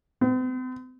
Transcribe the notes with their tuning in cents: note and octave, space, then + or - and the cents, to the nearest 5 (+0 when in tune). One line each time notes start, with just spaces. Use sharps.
C4 -45